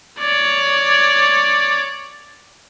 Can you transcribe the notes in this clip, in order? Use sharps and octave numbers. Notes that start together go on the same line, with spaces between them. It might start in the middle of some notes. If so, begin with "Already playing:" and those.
C#5 D5